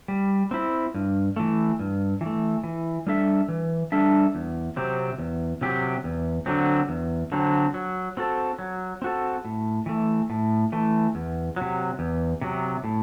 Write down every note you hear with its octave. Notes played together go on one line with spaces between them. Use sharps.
G3
C4 E4
G2
E3 A3
G2
E3
A3
E3
G3 D4 A4 E5
E3
G3 D4 A4 E5
E2
C3 F#3 C4 G4
E2
C3 F#3 C4 G4
E2
D3 F#3 C4
E2
D3 F#3 C4
F#3
C4 F#4 A4
F#3
C4 F#4 A4
A2
E3 A3
A2
E3 A3
E2
C3 F#3
E2
C3 F#3
A2